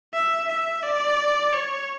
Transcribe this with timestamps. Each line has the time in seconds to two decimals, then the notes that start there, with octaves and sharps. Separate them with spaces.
0.14 E5
0.48 E5
0.83 D5
1.52 C#5